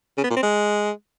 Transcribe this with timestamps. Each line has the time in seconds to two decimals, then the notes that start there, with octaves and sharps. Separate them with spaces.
0.18 C#3
0.24 B3
0.30 A#2
0.37 C4
0.43 G#3